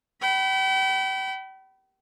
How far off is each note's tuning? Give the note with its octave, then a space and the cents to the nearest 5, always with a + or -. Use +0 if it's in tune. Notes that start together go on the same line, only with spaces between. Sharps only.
G5 -40 B5 +0